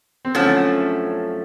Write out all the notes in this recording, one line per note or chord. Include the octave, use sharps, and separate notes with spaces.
C4
F#2 D3 F3 A3 C#4